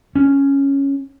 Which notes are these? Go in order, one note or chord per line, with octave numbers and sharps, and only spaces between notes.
C#4